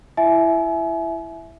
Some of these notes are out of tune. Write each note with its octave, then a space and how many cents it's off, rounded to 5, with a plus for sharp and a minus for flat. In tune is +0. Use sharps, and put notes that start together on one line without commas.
E4 +20 E5 +0 G#5 +35